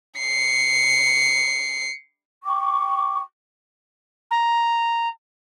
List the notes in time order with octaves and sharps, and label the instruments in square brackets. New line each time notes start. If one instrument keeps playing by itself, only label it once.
[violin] C7 C#7
[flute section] G5 C#6 D6
[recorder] A#5